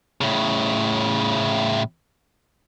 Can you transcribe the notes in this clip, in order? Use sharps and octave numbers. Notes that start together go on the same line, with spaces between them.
A2 C#3